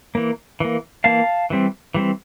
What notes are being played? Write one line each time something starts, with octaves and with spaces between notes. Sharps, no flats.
E3 A#3
E3 A#3
E3 A#3 F5 A5
E3 G3 C4
E3 G3 C4